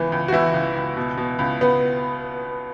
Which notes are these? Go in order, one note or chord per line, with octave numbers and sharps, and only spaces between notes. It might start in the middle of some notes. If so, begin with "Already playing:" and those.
Already playing: C#2 E3 B3
C#2
F#4
E3 E4
C#2
C#2
B2
B2
C#2
C#2 B3